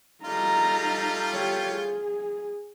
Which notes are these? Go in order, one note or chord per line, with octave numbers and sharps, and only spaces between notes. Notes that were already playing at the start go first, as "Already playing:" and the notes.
G3 A3 D#4 F4 A#5
G4 C#5
G#4